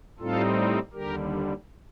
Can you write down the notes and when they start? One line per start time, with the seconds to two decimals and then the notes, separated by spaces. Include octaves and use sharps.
0.20 A2 G3 C4 D#4 F4 A4
0.93 D#2 D3 G3 G4 A#4